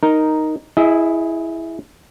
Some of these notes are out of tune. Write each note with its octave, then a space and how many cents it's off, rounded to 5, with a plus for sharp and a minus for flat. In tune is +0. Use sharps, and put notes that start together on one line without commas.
D#4 +0 A#4 +0
E4 +0 G#4 +0 D#5 +30